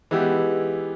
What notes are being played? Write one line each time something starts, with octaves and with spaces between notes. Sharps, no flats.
E3 G#3 B3 E4 G4